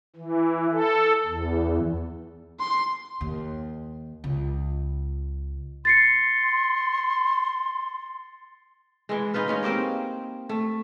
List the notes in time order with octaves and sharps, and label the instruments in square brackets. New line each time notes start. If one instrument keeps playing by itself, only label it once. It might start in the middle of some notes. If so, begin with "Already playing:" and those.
[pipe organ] E3
A4
E2
[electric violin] C6
[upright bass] D#2
C#2
[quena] C6 [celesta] A6 C7 C#7
[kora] E3 G#3
D#4 F4 B4 F5
G#3 C#4 D#4
A#3 C4 G4 A#4
A3